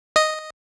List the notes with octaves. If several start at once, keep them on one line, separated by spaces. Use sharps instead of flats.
D#5